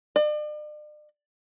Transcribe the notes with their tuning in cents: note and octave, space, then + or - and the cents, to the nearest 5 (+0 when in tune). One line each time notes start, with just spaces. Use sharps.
D5 +40